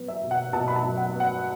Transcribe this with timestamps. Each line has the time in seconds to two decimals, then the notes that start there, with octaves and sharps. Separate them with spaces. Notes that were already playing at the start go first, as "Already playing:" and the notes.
Already playing: F#3 B3
0.08 E5
0.23 B2
0.31 F#5
0.53 B2 A5
0.68 B5
0.76 A5
0.83 F#3
0.97 F#5
1.13 B3
1.20 F#5